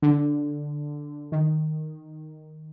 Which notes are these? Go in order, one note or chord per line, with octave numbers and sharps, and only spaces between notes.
D3
D#3